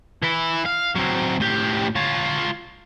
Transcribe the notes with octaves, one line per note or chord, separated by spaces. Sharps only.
E3 E4
F5
F#3 C4
A2 G4
F4 C#5